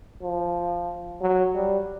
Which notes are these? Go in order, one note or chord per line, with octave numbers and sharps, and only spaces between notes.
F3
F#3
G3